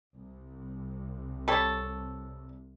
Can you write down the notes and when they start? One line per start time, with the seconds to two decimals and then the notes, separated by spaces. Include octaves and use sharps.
0.15 C2
1.48 G3 A4 C#5